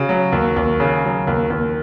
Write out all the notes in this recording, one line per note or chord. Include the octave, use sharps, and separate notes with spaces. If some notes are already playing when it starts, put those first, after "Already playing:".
Already playing: C#3 F#4
F#3
D#2
D#2
C#3
F#3
D#2
D#2